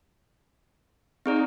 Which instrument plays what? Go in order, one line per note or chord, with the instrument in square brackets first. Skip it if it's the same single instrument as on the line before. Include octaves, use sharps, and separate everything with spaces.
[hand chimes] C4 G#4 D5 [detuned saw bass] D#4